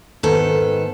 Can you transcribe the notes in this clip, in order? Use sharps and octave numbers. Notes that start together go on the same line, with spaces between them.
G#2 D#3 B3 A4